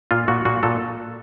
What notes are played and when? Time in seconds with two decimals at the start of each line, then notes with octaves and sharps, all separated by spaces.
0.11 A#2 F4
0.28 A#2 F#4
0.45 A#2 F#4
0.63 A#2 A4